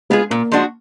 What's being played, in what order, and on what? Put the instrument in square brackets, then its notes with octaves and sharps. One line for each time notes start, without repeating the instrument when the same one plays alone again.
[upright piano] G#3 [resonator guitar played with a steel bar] B3 F4 G#4
[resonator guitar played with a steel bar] A#2 [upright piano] A#3
[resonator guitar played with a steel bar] F3 G#3 D4 F#4